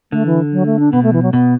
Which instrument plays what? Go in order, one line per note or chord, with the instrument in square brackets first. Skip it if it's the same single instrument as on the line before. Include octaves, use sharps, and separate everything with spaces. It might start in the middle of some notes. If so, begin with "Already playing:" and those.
[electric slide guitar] D3 [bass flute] A3
[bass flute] E3
F#3
A3
D4
[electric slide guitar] B2 [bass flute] B3
[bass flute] A3
E3
F#3
[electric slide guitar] B2 [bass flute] B3